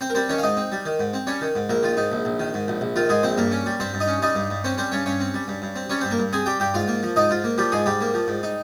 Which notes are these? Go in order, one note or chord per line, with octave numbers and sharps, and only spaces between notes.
C4 C5
A#4
G3 C4 C5
D#3 C#4 C#5
F5
G#2 D#4 D#5
C4
G3
D#3
G#2
C4
G3 C#4 C#5
D#3
G#2
A#1 A#3 A#4
D#3 F4
G#2 D#4
A#1
A#1
D#3
G#2
A#1
A#1
D#3 F4
G#2 G#3 G#4
A#1 C4 C5
G2 A#3 A#4
C#4
G3
G2 C4 C5
G2
D#4 D#5
C#4
G3 D#4 D#5
G2
G2
C4 C#4 C5
G3 C4 C5
G2 C#4 C#5
G2 C#4 C#5
C4
G3
G2
G2
C4
G3 C#4 C#5
G2 C4 C5
A#3 A#4
G2
C4 G#4 G#5
G3 G4 G5
G2 G4 G5
G#2 F4 F5
A#3
F3
G#2 D#4 D#5
G#2 F4
A#3
F3 G3 G4
G#2 G#3 G#4
G#2 G3 G4
A#3
F3
G#2
D#4